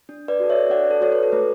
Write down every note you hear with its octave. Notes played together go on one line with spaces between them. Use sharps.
D4
B4 D5
F#4 A4
C#5 E5
D4 D5 F#5
A4
F#4 A4 C#5
B4
A4
A3 B4